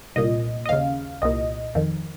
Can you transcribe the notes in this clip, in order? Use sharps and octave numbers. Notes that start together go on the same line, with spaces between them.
C2 A#2 D#5
D#5
D#2 C#3 F5
C2 A#2 D#5
F2 D#3